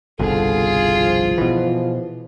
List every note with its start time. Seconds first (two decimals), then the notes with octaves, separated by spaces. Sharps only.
0.19 G1 C2 B2 F4 G#4 A4
0.98 F3
1.38 B2 E3